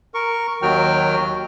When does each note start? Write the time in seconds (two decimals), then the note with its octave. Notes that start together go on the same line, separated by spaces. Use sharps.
0.14 A#4 C#6
0.62 D#2 D#3 F#3 F#4 G5 F6